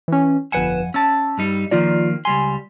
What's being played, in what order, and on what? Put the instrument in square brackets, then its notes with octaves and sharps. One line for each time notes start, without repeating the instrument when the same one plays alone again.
[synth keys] E3 C#4
[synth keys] G1 B4 E7 [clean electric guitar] F2 F#5 G#5
[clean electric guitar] C#4 A5 [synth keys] E6
[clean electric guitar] G2 G3 D#4
[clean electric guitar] D#3 F3 A#3 [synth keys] F4 D5
[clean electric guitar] C#2 G3 C6 [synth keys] G#5